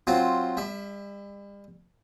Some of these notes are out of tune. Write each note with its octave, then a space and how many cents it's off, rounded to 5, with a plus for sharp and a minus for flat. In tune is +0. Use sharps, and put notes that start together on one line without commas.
F#3 +0 C4 +5 F4 +0
G3 +40 E5 +0